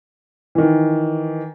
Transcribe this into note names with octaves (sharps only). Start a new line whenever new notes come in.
D#3 E3